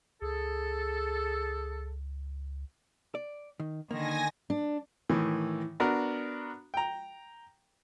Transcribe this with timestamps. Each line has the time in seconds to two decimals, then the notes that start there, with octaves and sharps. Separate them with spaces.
0.22 C#2 G#4 A4
3.15 D5
3.60 D#3
3.91 D3 D#3 A#3 G#5 A#6
4.50 D4
5.09 A2 D#3 E3
5.80 B3 D4 F#4 A#4
6.74 G5 A#5